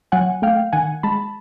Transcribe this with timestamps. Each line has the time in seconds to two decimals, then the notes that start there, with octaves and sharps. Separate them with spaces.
0.12 F#3 F#5 G#5
0.42 A3 F5 G5
0.73 D#3 F#5 G#5
1.03 G#3 A5 B5